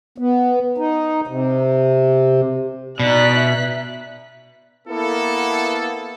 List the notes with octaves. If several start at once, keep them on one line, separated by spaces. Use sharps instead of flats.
B3
D#4
C3
B2 D#4 D5 F#6 B6
E5
A#3 B3 E4 A4